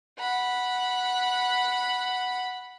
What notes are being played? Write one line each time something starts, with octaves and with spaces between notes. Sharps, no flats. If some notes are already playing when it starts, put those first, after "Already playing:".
F#5 B5